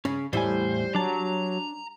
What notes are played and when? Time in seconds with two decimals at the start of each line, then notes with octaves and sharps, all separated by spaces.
0.05 C#3 C#4
0.33 E2 A2 G3 E4 C5 G#5
0.95 F#3 D4 A5 A#5